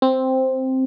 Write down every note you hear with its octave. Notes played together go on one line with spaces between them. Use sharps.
C4